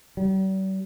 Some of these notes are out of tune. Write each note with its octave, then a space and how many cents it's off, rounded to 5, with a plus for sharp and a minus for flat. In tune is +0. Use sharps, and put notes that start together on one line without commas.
G3 -45